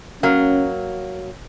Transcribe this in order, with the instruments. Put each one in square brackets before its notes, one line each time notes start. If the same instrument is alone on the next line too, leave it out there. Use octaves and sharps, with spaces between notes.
[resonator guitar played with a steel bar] F#3 A#3 [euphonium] C#4